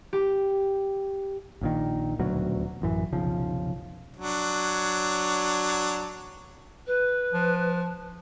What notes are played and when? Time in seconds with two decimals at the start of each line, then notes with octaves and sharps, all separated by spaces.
0.13 G4
1.61 A#1 A#2 D#3
2.19 D#1 D2 B2 F#3
2.82 A1 F#2 E3
3.12 F1 B1 C#3 F3
4.17 F#3 D4 C#5
6.86 B4
7.33 F3